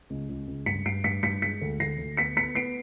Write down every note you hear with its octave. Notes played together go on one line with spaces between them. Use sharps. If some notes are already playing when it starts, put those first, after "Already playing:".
C#2
C#2
C#2
G2 B6 C#7
G2 C7 D7
G2 B6 C#7
G2 B6 C#7
G#3 B6 C#7
D2
D2 A#6 C7
D2
B3 B6 C#7
B3 B6 C#7
B3 C7 D7